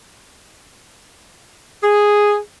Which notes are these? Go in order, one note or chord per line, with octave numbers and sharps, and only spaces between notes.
G#4